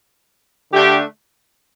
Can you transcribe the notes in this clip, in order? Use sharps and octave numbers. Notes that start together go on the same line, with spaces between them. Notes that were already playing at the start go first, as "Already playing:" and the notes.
D3 A3 D4 G4